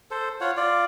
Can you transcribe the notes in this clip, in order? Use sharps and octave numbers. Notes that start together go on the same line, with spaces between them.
A4 C5
F4 C#5 F#5
F4 D5